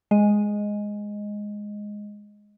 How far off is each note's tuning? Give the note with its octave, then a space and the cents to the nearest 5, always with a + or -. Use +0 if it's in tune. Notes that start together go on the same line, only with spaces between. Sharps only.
G#3 +0 D#5 +0